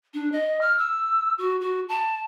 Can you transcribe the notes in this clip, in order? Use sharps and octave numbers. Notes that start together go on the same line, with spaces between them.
D4
D#5
F6
E6
F#4
F#4
A5